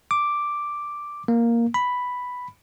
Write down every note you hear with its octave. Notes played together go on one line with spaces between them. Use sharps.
D6
A#3
B5